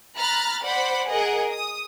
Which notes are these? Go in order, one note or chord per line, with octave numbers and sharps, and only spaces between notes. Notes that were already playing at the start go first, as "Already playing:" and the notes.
A#5 B5 F6 F#6 A6
C5 D5 F#5 B5
G#4 A#4 D#5 F#5
D#6